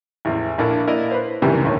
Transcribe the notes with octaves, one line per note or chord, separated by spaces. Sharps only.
A1 E2
A#1 A#3 D4 E4 A4
A#3 E4 A#4 D5 D#5
B4 C5
C#2 F#2 C3 D#3 E3 G3
A#1 D#2 A2 C#4